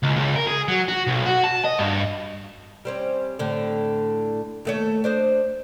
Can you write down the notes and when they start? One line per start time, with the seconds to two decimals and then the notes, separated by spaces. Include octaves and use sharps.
0.03 C#2
0.16 C#2
0.36 A#4
0.47 G#4
0.68 F#3
0.88 F#4
1.07 B1
1.26 F#4
1.44 A5
1.64 D#5
1.79 G2
2.85 G3 C4 C#4
3.39 A2 D3
4.65 D#2 A3 C#5
5.04 D4 C5 D#5